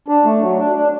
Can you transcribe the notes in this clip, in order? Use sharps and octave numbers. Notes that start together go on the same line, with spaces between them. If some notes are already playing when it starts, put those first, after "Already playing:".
D4
A3
F#3
D4
D4